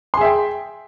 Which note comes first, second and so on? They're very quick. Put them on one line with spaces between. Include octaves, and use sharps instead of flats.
C6 G#4 E5 G5